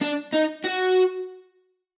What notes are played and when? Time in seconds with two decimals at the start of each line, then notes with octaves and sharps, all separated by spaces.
0.01 D4
0.33 D#4
0.64 F#4